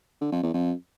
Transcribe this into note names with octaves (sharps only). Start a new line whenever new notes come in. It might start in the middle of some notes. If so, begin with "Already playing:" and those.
D3
F2
E2
F2